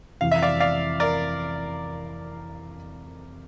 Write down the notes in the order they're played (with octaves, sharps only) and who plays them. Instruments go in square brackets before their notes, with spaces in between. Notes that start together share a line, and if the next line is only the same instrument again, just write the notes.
[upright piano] F2 C3 E3 [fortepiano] F5
[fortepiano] E5
D5 F5
D5 F5
A#4 D5